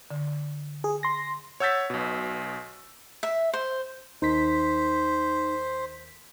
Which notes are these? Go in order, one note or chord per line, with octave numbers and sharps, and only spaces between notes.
D3
G#4
C6 A#6
C#5 F#5 E6 G6 A6 B6
B1 B2
E5
C5
D#2 D#4 C5 B6